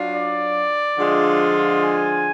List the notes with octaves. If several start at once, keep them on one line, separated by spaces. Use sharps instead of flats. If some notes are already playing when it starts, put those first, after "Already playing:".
Already playing: F#3 D4 F4
D5
D3 F3 G#3 D4 F4
G#5